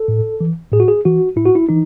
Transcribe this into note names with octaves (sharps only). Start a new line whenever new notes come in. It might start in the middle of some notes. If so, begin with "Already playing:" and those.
Already playing: A4
A2
E3
A2 G#4
F#4
G#4
E3 F#4
A2 E4
F#4
E4
E3 D#4